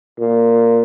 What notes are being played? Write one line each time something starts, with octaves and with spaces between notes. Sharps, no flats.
A#2